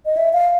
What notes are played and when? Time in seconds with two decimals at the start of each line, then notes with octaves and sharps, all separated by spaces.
0.06 D#5
0.17 E5
0.33 F5